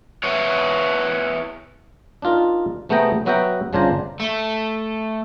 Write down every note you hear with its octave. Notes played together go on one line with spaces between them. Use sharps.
B3 E4 C#5
D4 D#4 F4 A#4
C3 A3 B3 G#4 G5 A#5
F#3 B3 F#4 E5 G5 A#5
G1 C#3 D4 F4 C5 A#5
A3